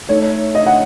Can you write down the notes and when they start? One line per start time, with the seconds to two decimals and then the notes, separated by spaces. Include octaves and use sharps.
0.09 A3 D#4 A4 C#5
0.55 D#5
0.66 F#5